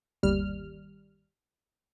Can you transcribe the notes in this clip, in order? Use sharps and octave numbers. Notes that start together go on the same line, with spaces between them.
G1 D#2 G3 F6